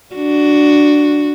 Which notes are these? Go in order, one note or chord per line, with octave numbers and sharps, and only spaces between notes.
D4 F#4